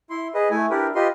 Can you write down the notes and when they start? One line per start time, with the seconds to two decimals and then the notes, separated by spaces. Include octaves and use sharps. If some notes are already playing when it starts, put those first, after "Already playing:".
0.10 E4 C6
0.34 G#4 B4 D#5
0.51 A3 E4 G#5
0.70 D4 E4 G4 A#4 B4
0.95 F4 G4 B4 D#5 C6